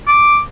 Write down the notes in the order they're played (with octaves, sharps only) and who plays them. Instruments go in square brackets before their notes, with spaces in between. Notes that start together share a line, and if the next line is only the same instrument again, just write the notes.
[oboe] D6